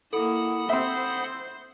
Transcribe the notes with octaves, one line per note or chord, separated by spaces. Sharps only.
A#3 E4 A4 F#5 B5 D#6
C4 C5 E5